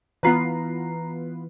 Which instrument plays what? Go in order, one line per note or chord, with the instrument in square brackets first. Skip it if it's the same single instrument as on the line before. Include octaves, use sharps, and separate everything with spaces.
[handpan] E3 [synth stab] B3 F4 B4 [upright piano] A#5 C7